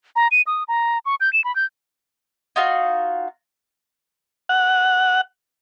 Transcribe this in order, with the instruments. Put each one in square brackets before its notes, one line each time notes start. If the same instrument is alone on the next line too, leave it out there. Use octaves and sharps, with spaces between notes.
[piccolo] A#5
D#7
D#6
A#5
C#6
G6
E7
B5
G6
[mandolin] D#4 F4 F#4 F5
[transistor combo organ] F#5